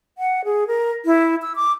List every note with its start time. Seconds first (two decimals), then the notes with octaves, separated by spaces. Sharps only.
0.18 F#5
0.44 G#4
0.67 A#4
1.05 E4
1.42 E6
1.55 D6